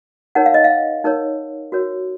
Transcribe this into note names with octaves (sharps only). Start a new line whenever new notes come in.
D#4 A#4 C#5 F#5
F5
D#5
F5
D#4 A#4 C#5
F#4 A#4 C#5